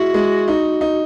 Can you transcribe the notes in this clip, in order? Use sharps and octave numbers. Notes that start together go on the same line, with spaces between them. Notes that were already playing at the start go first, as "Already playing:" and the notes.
Already playing: G#3 E4 F#4
G#3
D#4
D#4